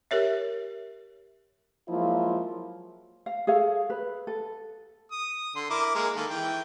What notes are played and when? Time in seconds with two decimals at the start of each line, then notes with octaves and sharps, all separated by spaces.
0.11 G4 A#4 C#5 E5
1.89 F3 F#3 G#3 A#3 E4 F4
3.26 F5
3.47 G#4 A4 C#5 F5
3.90 B4
4.27 A4
5.12 D#6
5.56 D3 C6
5.70 E4 A#4 D6
5.95 G#3 A#3 A#4
6.16 D#3 A#3 A4
6.30 E3 G5